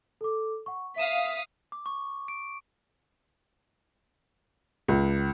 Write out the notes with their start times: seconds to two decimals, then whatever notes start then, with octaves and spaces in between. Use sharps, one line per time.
0.21 A4 D6
0.66 F#5 C#6
0.96 E5 F5 D#6 B6 E7
1.72 D6
1.86 C#6
2.28 D7
4.88 C#2